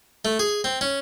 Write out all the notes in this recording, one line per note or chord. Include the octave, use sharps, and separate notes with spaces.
A3
G#4
C4
C#4